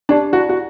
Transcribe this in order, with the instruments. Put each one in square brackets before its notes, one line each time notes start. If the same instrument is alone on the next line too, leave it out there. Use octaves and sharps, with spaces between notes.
[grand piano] D4 [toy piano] G4 D5 A5
[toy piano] E4 [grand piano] F#4
[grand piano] F#4